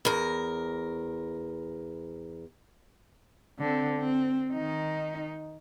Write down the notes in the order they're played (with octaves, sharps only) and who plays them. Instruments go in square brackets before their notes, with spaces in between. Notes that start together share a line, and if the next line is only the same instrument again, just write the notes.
[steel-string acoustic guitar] E2 A#4
[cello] D3 C4
C4
D#3 D#4